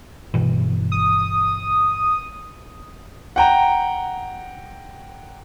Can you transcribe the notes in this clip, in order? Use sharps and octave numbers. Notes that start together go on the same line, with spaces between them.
G1 B2 E3
D#6
F#5 G5 A#5